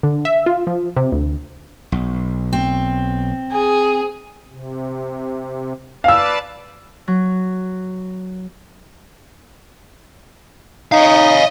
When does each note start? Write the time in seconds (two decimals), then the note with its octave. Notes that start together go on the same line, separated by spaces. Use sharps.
0.03 D3
0.25 E5
0.46 F4
0.67 F3
0.96 C3
1.12 D2
1.92 B1
2.53 C4
3.52 G#4
4.48 C3
6.04 B4 D5 F5 A5 E6
7.08 F#3
10.92 D#4 C#5 D#5 F5